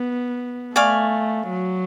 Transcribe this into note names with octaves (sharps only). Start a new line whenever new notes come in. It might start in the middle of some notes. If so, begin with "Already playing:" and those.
Already playing: B3
A3 D5 F5 G#5 C#6
F#3